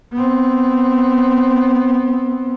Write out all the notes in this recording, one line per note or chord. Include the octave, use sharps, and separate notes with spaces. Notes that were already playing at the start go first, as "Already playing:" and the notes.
B3 C4